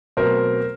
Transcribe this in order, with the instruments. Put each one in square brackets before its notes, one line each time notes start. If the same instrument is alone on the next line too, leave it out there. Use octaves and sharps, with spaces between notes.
[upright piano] B2 F#3 A3 C4 A#4 C5